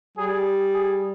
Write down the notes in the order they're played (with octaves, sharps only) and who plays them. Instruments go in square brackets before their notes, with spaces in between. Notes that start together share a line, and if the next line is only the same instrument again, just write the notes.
[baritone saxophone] G3 [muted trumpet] G#4
[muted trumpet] G#4